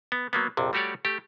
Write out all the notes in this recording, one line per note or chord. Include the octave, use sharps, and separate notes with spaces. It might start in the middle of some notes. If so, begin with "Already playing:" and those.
B3
F#3 A#3 B3
A#1 F2 C3
G3 A3 F#4 G4 C#5 D5
A3 G4